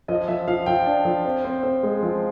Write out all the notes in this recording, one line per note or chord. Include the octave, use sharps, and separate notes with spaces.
F3 D#5
F3 E5
F3 F5
F3 G5
D4
F3
C4
C4
C4
G#3
F3